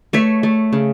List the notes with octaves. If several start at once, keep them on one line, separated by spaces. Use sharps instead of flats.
A3 C#5 E5
A3
C#3